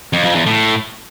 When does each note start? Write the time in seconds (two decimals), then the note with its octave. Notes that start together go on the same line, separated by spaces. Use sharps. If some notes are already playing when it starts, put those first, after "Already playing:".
0.13 F2
0.24 F2
0.35 E2
0.46 A2